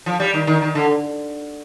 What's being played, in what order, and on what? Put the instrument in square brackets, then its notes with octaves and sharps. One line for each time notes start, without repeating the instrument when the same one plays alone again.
[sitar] F3
G3
D#3
D#3
D#3
D3